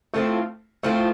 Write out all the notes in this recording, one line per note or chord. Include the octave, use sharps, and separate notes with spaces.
A2 F3 A3 C4 F4
A2 F3 A3 C4 F4